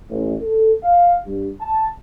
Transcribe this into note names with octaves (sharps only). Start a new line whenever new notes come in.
A1
A4
F5
G2
A5